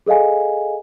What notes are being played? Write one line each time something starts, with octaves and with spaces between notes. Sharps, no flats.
G#4 A4 D#5 F5 G#5